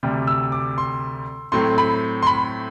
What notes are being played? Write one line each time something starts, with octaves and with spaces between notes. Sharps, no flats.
D2 C3 G3
E6
D6
C6
A2 F#3 C4 C6
B5
C6
B5